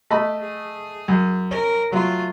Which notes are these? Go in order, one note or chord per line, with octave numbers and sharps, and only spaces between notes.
A3 D#5 B5
G#4
F#2
C#4 A#4
F#3 A3 F4